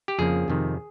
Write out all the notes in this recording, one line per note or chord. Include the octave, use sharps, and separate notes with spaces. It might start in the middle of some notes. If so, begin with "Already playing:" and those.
G4
F2 C#3 F3 A#3 G#4
F2 C3 D#3